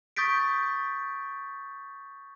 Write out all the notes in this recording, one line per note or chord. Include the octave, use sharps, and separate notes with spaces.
C#6 D#6 G6 A6 B6 D7